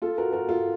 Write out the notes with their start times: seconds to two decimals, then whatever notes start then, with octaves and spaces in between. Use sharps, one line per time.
0.02 F4 A4
0.18 F#4 A#4
0.32 F#4 A#4
0.48 F4 A4